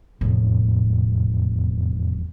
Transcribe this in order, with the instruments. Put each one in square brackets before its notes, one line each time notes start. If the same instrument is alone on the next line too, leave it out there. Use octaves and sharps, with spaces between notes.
[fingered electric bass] E1 F2 [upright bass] A2